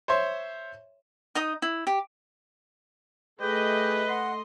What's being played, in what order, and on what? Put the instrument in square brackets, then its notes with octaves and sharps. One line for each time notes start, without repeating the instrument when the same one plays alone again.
[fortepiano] C5 C#5 E5 C6
[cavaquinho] D#4 D#5 D#6
E4
G4
[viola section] A3 D#5 [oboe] G4 [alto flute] G#4 [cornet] B4
[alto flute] F#5 [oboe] C6